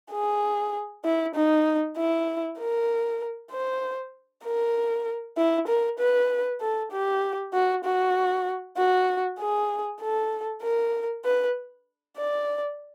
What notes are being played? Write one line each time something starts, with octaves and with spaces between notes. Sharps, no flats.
G#4
E4
D#4
E4
A#4
C5
A#4
E4
A#4
B4
A4
G4
F#4
F#4
F#4
G#4
A4
A#4
B4
D5